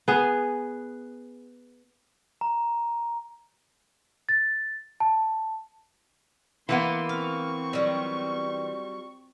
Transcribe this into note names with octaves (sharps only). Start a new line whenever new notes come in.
B3 G#4
A#5
A6
A5
E3 A#3 B3 B5 C6
C4 F5 C#6
F#3 G3 F4